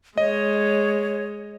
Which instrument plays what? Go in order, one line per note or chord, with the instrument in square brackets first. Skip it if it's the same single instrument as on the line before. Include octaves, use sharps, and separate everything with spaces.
[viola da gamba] G#3 [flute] C#5 [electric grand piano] D#5